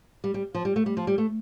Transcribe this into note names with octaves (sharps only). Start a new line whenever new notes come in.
G3
G3
F3
G3
A3
G3
F3
G3
A3